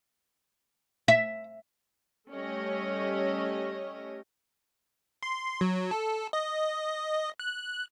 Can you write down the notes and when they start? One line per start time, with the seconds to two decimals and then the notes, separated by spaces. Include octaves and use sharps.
1.08 E5
2.33 G3 A3 C#4 G4 C#5 D#5
5.23 C6
5.61 F#3
5.91 A4
6.33 D#5
7.39 F#6